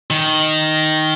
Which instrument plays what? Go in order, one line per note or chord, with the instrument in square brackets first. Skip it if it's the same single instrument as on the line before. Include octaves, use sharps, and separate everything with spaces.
[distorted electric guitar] D#3